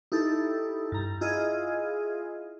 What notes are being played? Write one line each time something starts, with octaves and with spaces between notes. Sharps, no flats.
D#4 E4 G4 A4
G2 A#5
E4 F4 G#4 D#5